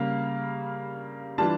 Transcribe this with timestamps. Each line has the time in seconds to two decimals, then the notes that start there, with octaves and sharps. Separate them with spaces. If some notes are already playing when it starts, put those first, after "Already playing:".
Already playing: C#3 G3 A#3 F5
1.38 E3 G3 D4 F4 A5